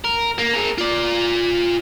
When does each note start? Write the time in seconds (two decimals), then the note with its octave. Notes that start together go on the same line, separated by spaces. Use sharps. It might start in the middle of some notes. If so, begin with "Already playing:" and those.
0.04 A#4
0.38 A#3
0.53 G#4 A#4
0.78 F4 D5